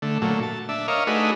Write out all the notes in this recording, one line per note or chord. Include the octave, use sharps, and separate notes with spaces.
D3 A3
A#2 F#3 A3
A5
D4 E5
A#4 C#5 D#5 F5
A3 D4 D#4 F#4 G#4 B4